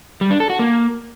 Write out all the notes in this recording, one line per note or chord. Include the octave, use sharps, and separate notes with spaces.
G3
D4
A4
F#4
A#3